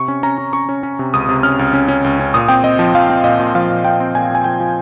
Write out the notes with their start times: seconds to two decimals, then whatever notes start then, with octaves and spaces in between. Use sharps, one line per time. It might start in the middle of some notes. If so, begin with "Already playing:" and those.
Already playing: C3 C#6
0.08 C#4
0.23 C#4 A#5
0.38 C#4
0.53 C#4 C#6
0.69 C#4
0.83 C#4
0.99 C3
1.13 C#2 D#6
1.29 C3
1.43 C#4 F6
1.59 C#2
1.73 C#4
1.88 C#4
2.04 C#2
2.20 C#4
2.34 A#2 D#6
2.49 C4 G5
2.64 C4 D#5
2.79 F3
2.95 F3 F5
3.10 C4
3.24 A#2 D#5
3.40 A#2
3.55 F3 F5
3.70 A#2
3.84 F3 G5
4.00 C4
4.15 A#2 G#5
4.30 A#2
4.35 G#5
4.44 F3 G5
4.60 F3